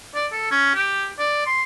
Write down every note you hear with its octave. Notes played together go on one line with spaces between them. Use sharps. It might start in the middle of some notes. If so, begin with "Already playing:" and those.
D5
A4
C#4
G4
D5
C6